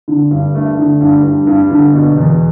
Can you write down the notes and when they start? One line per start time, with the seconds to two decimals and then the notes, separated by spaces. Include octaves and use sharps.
0.08 D3
0.31 G2
0.55 A3
0.78 D3
1.01 G2
1.23 G2
1.47 G2
1.70 D3
1.93 B2
2.17 E2